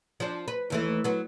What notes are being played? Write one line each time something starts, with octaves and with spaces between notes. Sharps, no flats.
F3 D4
B4
D#2 E3 A3
F#3 B3